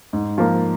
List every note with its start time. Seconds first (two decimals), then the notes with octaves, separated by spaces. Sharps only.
0.13 G#2
0.38 F3 A#3